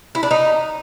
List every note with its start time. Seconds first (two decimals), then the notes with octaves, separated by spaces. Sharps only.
0.15 E4
0.23 D4
0.31 D#4